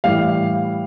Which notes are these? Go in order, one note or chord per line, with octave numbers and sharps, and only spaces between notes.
A2 E3 G3 F5